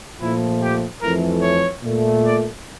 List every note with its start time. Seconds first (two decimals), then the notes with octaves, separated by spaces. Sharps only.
0.20 A#2 F3 A3 E4
0.61 G4
1.01 F2 E3 A3 A#4
1.41 C#5
1.82 A#2 A3
2.23 D5